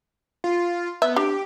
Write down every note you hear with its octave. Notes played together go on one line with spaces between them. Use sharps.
F4
B3 E5
D4 G4